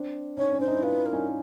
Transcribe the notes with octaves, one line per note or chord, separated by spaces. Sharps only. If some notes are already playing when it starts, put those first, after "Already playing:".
Already playing: C4 D4
C#4 D#4 C#5
C#4
D4 C5
D#4
E4
D#4 F4 B4
A#4
C#4 D#4